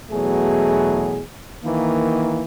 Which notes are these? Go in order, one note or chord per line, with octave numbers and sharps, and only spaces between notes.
E2 B2 F#3 A3 G#4
D#3 E3 A#3